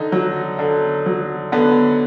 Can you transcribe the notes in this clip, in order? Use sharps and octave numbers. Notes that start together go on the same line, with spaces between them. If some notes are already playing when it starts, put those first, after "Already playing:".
Already playing: D3 D#4
F#3
D3
F#3
D3 B3